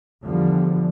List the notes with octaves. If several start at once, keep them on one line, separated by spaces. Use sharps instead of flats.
E2 D3 F3 G3